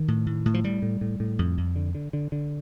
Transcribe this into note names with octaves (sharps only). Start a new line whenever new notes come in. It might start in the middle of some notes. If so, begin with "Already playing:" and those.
Already playing: D#3
A2
A2
A2
F3
A2 G3
A2
A2
A2
F2
F2
D3
D3
D3
D3